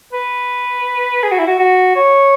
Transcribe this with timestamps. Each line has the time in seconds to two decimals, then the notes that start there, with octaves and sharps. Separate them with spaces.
0.13 B4
1.23 G#4
1.31 F#4
1.39 E4
1.47 F#4
1.59 F#4
1.96 C#5